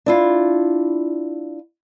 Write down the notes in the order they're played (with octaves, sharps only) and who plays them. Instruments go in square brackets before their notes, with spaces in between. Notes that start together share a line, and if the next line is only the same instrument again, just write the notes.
[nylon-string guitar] D4 E4 F4